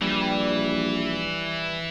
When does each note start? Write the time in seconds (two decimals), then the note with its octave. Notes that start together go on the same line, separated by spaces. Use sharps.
0.02 A#1 E3 G3